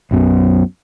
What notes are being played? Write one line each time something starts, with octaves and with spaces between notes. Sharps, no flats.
B1 F#2 B2